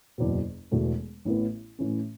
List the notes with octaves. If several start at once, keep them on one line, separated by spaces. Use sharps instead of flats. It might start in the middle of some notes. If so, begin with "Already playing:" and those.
F#1 E2 B2
E1 E2 B2 A3
A1 A2 E3 B3
A2 E3 C#4